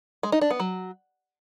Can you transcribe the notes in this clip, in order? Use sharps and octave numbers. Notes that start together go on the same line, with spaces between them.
G#3
D#4
D4
B3
F#3